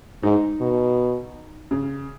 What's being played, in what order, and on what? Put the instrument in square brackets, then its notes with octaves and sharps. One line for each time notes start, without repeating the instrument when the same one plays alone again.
[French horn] G#2 [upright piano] D#4
[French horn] B2
[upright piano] C#3